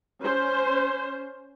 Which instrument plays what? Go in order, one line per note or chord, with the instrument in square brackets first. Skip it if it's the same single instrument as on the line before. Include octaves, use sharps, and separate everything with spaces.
[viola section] C#4 C5